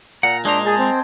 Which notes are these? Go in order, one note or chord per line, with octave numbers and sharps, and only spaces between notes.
A#2 F#5 A#5
G#3 D4 C5 D#5 A#5
G#4 G#5 A5
C4